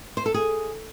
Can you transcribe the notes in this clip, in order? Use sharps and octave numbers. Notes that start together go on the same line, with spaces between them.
C5
A4
G#4